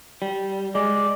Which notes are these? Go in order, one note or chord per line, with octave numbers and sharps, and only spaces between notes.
G3
G#3 D5